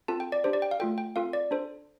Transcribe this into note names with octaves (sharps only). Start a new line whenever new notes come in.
C4 F4 A4 A5
G5
D5
D4 G4 C5
D5
G5
F5
A3 F4 A4 G5
G5
C4 F4 A4 F5
D5
D4 A4 C5